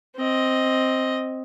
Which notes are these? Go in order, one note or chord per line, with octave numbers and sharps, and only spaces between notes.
C4 D#5